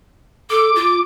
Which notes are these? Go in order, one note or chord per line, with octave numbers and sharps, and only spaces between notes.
A4 D6
F4